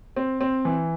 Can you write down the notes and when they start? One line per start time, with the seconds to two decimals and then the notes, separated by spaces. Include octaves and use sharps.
0.16 C4
0.41 C4
0.65 E3